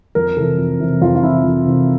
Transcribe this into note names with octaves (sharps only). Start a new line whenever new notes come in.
F2 A#4
C3 E3 A4
F2
C3 E3
F2 F4
F4
C3 E3 E4
F2
C3 E3